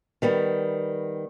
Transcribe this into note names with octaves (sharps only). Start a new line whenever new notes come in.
D#3 G3 B3